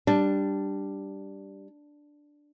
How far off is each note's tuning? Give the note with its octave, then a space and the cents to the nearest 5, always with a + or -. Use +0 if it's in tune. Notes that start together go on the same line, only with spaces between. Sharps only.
G3 +0 D4 +0